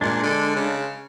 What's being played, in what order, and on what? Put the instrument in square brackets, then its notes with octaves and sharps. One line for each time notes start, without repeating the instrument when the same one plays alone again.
[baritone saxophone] A#2 [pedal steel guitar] G#3 D4
[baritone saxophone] D3
C#3